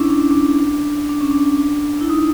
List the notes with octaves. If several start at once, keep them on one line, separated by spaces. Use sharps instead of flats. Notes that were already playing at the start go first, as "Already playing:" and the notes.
Already playing: C#4 D4 E4
D4
C#4
D4
D4
C#4
D4
E4
D#4